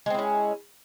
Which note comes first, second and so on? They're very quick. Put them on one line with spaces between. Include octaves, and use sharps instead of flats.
G#3 C4 E4 C#4